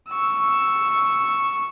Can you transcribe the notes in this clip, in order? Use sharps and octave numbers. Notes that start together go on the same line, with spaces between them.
C#6 E6